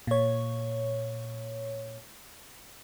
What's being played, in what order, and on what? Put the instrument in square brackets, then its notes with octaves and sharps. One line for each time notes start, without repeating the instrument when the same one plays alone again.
[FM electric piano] A#2 C#5